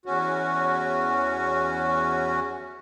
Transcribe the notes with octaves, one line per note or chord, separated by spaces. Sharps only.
E2 C#4 F#4